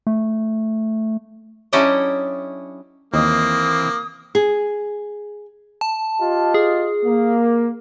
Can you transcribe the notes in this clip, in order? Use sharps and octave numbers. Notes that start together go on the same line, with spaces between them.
A3
F#3 C#4 D4 E4 G4 D#5
D#2 E3 A#3 C4 D#5 D#6
G#4
A5
F4 G4 D#5
G#4
A#3